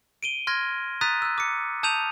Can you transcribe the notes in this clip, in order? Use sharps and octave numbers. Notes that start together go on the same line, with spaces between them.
D7 D#7 G7
C6 F6 G#6 A#6
A#5 D#6 F#6 A6 B6 D#7
E6 F#6
D6 C#7
A5 D#6 G6 D#7 F7